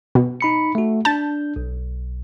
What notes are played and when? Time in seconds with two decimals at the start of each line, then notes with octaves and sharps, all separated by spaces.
0.15 B2
0.41 D#4 B5 C#7
0.75 A3 F#4
1.05 D4 A5 G6
1.56 B1